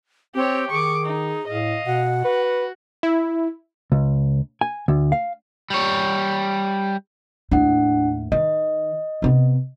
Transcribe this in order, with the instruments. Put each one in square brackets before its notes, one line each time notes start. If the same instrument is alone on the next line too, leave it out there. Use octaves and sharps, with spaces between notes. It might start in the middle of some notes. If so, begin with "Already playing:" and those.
[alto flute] C4 [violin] G4 C#5
[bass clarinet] D#3 [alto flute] G#4 [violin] C#6 D6
[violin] D#4
[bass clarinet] A2 [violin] D#5 F5
[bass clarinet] B2 [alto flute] F#5
[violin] F#4 [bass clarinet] B4
[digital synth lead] E4
[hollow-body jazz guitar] C#2
G#5
D2
F5
[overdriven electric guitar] G3 C#5
[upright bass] D#2 A2 [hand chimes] D4 F#5
[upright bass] D#3 [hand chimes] D#5
[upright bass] C3 B3